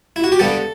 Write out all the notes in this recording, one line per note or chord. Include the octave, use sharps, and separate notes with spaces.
E4
F#4
G4
G2 D3 G3 B3 A4